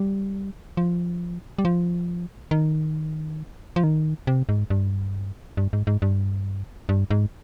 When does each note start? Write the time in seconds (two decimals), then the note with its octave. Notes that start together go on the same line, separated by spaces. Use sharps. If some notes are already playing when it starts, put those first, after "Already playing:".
Already playing: G3
0.77 F3
1.59 G3
1.65 F3
2.51 D#3
3.76 F3
3.84 D#3
4.27 C3
4.49 G#2
4.70 G2
5.57 G2
5.73 G#2
5.87 G#2
6.02 G2
6.89 G2
7.11 G#2